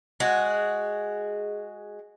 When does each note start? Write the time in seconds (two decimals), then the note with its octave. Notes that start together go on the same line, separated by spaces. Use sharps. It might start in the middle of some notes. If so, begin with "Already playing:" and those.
0.20 G#3 F#4